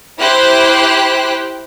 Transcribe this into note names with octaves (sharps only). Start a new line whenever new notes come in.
E4 G4 C5 G5 F#6